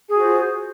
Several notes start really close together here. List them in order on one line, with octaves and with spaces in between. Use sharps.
G#4 F#4 C5 F4